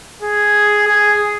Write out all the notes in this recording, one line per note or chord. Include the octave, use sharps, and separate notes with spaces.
G#4
G#4